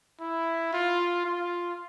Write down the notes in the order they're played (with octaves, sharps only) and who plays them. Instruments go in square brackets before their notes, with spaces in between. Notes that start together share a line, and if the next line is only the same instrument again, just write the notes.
[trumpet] E4
F4
F4